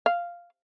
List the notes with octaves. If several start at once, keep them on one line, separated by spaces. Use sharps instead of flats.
F5